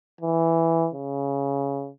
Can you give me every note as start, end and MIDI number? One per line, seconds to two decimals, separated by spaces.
0.21 0.89 52
0.94 1.90 49